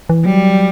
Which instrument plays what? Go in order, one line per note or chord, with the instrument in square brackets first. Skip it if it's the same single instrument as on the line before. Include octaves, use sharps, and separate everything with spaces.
[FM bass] E3
[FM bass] F#3 [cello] G3